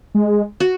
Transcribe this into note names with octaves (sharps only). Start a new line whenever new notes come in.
G#3
F#4